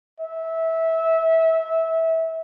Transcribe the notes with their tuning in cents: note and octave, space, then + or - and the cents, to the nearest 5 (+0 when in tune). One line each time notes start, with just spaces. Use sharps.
E5 -20